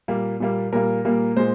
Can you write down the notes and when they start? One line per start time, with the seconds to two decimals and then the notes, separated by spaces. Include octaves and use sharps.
0.08 A#2 G3 A#3
0.40 A#2 G3 A#3
0.72 A#2 G3 A#3 A#4
1.05 A#2 G3 A#3
1.36 A#2 G#3 C5